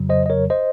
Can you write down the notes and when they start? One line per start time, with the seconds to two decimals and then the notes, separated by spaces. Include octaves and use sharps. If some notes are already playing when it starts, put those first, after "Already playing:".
Already playing: F2 C#3 F#3
0.09 C5 D#5
0.26 D#5
0.30 A#4 C#5
0.50 C5 D#5